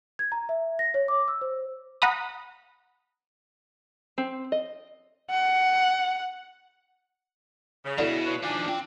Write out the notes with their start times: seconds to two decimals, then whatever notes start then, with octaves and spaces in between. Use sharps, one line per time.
0.19 G#6
0.32 A#5
0.49 E5
0.79 A#6
0.94 C#5
1.08 D6
1.28 E6
1.42 C5
2.02 F#5 A#5 B5 D#6
4.18 C4
4.52 D#5
5.31 F#5
7.85 C#3
7.98 B2 D3 E4
8.27 F4 B4 C#5
8.43 D#3 F3 D4 G#5
8.68 C4 F4 G5